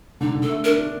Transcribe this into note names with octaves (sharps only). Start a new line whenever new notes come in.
D3 D#4
D3
A4
A3
D4 A#4
D4